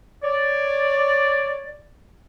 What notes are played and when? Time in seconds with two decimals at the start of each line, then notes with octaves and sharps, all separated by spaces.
0.23 C#5 D5